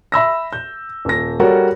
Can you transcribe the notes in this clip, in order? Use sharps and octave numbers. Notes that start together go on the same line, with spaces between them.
E5 B5 E6 A#6
G6
D#1 A#6
G3 F#4 A4 A#4 C#5